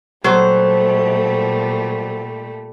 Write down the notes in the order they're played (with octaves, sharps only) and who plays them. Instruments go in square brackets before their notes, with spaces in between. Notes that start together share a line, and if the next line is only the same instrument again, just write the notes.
[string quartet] A#2 G3 A3 [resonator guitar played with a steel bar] F#3 C5